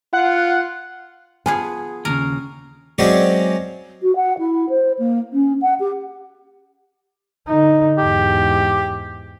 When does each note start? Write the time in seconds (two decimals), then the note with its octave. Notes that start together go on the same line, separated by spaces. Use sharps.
0.13 F4 F#5
1.46 F3 B3 G#4 G#5
2.05 D#2 A#2 C#3 A#4
2.98 F#3 G#3 C4 C#4 D5
4.02 F#4
4.16 F#5
4.38 E4
4.69 C5
4.99 A#3
5.32 C#4
5.62 F#5
5.79 G4
7.47 D3 D#4
7.98 E2 G#2 G4